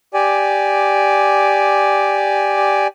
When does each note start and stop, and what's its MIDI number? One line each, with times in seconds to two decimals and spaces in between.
0.14 2.87 67
0.14 2.87 74
0.14 2.87 80